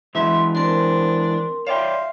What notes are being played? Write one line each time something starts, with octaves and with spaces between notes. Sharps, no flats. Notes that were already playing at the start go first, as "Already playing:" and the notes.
E3 F#3 G#3 E5 C6
C4 D4 A#4 C6
C#5 D5 E5 F5 G5 C6